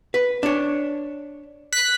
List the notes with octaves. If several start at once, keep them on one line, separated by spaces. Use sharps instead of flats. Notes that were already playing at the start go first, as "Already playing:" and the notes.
B4
D4 C#5
F#6 B6